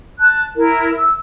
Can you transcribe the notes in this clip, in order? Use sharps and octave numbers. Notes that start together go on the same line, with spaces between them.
A5 F#6
E4 A#4
E6